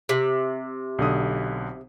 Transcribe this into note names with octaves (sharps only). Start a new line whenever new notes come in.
C3
B1 D3 D#6